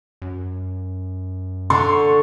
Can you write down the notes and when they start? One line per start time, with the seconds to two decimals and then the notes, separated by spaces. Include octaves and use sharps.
0.22 F#2
1.70 D3 C6 C#6